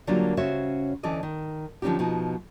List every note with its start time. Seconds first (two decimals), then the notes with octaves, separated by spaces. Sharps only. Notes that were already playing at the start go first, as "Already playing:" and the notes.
0.07 D3 F#3 G3 A#3 D4 F4
0.37 C#3 C#4 F#4 C5 C#5 E5
1.03 D2 E3 C#4 A4 D5 D#5
1.23 D#3
1.82 D3 F3 F#3 C#4 D#4 G4
1.99 B2 F3 D#4